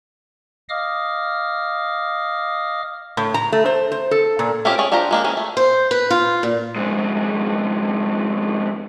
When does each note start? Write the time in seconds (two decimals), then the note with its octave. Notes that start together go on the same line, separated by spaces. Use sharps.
0.69 D#5 F5 D6 D#6 F6
3.17 A2
3.34 A#5
3.52 A3
3.66 C5
3.92 C5
4.11 A4
4.39 A#2
4.65 C4 C#4 E4 F4 G4
4.78 C#4 G#4 C#5 D5
4.92 D4 F4 G4 C5 A#5
5.11 G#3 A#3 D4
5.24 E3 C#4 G#4
5.37 A3
5.57 C5
5.91 B4
6.10 F4
6.43 A#2
6.76 F2 G#2